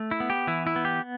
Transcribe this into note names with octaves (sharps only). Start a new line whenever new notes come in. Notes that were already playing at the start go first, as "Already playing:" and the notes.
Already playing: A3
E4
B3
G4
E3 E4
E4
B3
G4